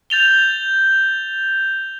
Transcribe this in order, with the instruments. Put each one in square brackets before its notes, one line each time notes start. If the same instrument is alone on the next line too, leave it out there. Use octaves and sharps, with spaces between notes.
[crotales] G6 A6 F7 G7